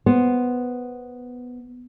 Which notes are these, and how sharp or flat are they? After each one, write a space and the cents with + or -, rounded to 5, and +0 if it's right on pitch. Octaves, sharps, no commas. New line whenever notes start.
B3 +0 C5 +0